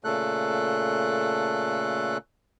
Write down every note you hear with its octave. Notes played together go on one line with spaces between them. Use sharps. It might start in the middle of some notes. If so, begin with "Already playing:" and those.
A#2 C#3 A3 A4 F#6